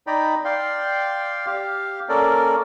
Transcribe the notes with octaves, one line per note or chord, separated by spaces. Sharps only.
D#4 D5 G5 A#5 B5
D5 F5 G5 C6
G4 F5
A#3 C#4 A4 A#4 D5